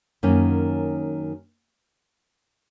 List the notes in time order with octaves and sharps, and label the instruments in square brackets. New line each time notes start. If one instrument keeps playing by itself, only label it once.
[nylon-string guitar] F#2 D#3 A#3 C#4